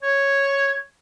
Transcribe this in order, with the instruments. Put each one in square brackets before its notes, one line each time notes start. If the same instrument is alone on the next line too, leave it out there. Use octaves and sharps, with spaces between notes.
[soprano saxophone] C#5 [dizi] G#6